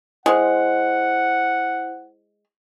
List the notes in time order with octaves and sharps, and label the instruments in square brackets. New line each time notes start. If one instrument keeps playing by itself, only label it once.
[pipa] G#3 [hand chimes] E4 C5 [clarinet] F#5